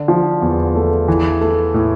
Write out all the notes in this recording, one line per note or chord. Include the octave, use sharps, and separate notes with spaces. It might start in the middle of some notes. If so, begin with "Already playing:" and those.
Already playing: D3
F3
E2
A3
E3
A3
A2